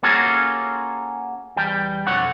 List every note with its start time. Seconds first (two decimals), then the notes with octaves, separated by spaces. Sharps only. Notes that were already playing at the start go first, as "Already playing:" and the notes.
0.03 A#3 C#4 F4 F#4 G#4 A4
1.56 E2 G3 G5
2.07 B1 F2 D3 C#5 F#5